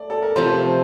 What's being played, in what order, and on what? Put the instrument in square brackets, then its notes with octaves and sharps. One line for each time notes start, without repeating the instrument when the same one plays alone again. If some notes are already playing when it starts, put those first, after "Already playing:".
Already playing: [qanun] A3 [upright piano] D5
[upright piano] A4
A#4
[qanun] C3 F3 A3 [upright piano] C5